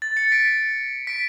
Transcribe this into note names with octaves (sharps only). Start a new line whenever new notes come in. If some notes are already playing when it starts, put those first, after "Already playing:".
A6
A6 C#7
B6 D7
B6 D7